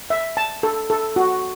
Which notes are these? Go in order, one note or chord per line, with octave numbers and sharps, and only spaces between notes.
E5
A5
A4
A4
F#4